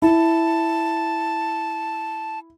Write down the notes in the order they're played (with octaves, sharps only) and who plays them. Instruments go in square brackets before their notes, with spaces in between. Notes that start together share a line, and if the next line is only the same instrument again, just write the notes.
[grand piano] E4 [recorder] A5